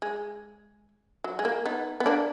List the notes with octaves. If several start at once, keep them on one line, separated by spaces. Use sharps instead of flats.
G#3
F#3
G#3
A#3
B3 D#4
B3
A#3 D4